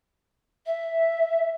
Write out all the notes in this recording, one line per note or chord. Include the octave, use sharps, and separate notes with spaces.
E5